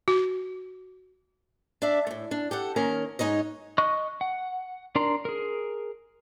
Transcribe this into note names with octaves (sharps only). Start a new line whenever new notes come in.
F#4
D4 D5 E5
A2 A3
D4
G4 A4 F#5
D#3 A#3 C#4 A#4
G#2 C3 D#4 C#5 D#5
D#5 C#6 F#6
F#5
D4 A#4 D5 A#5 C6
G#4 A#4